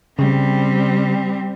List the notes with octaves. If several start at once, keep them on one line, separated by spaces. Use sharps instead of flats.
C#3 G3 C4